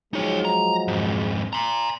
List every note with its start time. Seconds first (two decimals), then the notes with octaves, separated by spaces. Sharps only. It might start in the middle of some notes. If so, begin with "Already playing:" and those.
0.14 F3 F#3 G#3 D#4 C#5
0.45 A#5
0.88 F2 G#2
1.53 A#5 C6